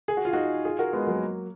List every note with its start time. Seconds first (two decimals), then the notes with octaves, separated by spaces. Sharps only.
0.08 G#4
0.17 F#4
0.25 F4
0.33 D#4 F#4
0.65 F4 G#4
0.79 F#4 A#4
0.93 G#3 B3
1.07 F#3 A#3